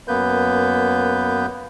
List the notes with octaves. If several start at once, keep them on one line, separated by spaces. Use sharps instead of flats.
F#2 A#3 B3 B4 G6